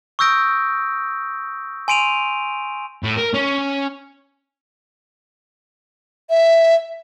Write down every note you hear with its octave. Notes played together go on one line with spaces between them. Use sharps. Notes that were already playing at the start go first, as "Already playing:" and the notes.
C#6 D#6 E6 G6 A#6 D7
G#5 C6 D7 D#7 F7
A2
A#4
C#4
E5